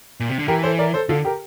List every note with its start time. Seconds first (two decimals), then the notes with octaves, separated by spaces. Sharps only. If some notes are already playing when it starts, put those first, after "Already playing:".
0.20 A#2
0.30 C3
0.39 D3
0.48 E3 G4 A#4
0.63 A4 C5
0.79 A#4 D5
0.94 A4 C5
1.09 D3 F4 A4
1.25 G4 A#4